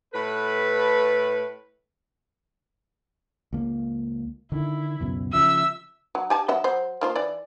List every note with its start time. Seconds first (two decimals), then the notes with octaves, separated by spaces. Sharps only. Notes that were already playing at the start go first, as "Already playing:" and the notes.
0.14 A2 A4 B4
3.53 C#2 A#3
4.52 D3 D#3 E4
5.00 C#2 F#2 B2
5.33 C#3 F3 E5 E6
6.15 F#3
6.30 G4 G#5 A5
6.48 F#3 D#5 E5
6.64 F#3 C5
7.01 A#3 F4 C5
7.15 E3 D5